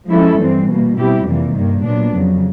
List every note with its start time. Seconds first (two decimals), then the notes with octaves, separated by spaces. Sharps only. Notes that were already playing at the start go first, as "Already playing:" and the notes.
0.09 F3 G#3 C#4 E4 A4
0.38 G2 E3 G3 C4
0.68 B2 G3 A#3
0.97 B2 G3 C4 E4 G4
1.26 F2 C3 E3 G3 A#3
1.55 G2 D#3 G3 A#3
1.84 A#2 F#3 B3 D4
2.14 F2 C#3 F#3